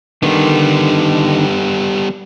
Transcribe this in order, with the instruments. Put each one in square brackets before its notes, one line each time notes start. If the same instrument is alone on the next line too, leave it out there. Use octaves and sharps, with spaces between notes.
[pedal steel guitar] D3 D#3 [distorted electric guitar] G3 B3